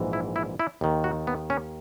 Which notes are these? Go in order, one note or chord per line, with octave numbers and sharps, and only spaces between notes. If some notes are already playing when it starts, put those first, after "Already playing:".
Already playing: A#1 G#2 E3
E4
E4
E4
D#2 D#3
F#4
B3
C#4